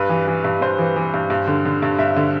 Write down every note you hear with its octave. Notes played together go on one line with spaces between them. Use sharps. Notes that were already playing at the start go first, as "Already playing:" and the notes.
Already playing: G2 B4
E3
E3
G2
G2 C5
E3
E3
G2
G2
D3
D3
G2
G2 E5
D3